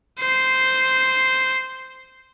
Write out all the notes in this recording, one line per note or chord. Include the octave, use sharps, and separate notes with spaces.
C5 C7